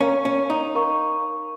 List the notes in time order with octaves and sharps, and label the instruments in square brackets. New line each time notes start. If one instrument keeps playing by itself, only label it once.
[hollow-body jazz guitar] C#4 [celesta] A#4 F5 A#5 C#6
[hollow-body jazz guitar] C#4
D#4
[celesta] A#4 F5 A#5 C#6